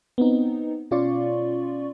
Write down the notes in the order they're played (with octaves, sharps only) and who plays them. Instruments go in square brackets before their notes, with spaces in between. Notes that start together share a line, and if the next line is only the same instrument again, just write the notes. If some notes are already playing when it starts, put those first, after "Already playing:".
[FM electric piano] B3 C4 D#4
B2 C#4 F4 D5 C6 C#6